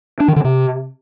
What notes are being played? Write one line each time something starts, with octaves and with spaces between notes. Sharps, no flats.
D4
D#3
D3
C3